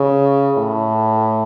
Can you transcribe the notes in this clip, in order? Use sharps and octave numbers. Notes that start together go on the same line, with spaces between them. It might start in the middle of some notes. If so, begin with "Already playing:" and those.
Already playing: C#3
A2